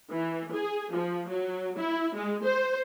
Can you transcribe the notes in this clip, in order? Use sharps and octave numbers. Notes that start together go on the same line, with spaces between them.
E3
G#4
F3
F#3
E4
G#3
C5